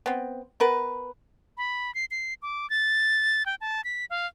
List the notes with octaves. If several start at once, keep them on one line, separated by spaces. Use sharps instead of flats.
B3 C4
B3 A#4 B4
B5
C7
C7
D6
A6
G5
A5
B6
F5